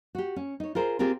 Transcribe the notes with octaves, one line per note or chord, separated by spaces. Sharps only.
F#4 G4
C#4
D#4 C#5
F4 G#4 A#4 C5
C4 F4 G4 G#4 A#4